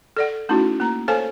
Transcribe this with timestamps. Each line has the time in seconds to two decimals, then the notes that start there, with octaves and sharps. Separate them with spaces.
0.17 A4 D5 F#5
0.49 A3 C#4 D#4 E4 F#4
0.80 A#3 A#5
1.08 A4 C5 C#5 F5 G#5 A5